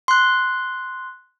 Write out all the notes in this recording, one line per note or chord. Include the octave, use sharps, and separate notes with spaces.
C6 F#6